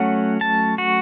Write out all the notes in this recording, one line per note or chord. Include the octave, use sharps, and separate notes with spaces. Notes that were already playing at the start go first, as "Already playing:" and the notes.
Already playing: F#3 A3 C#4 F#5
A5
F#4